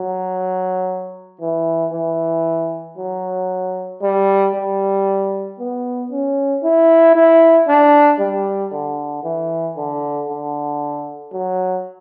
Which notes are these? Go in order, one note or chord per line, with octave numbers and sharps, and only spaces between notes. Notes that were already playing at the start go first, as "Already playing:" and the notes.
Already playing: F#3
E3
E3
F#3
G3
G3
B3
C#4
E4
E4
D4
G3
D3
E3
D3
D3
F#3